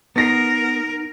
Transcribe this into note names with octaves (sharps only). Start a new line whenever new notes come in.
B3 D#4 A#4 A6 A#6 C7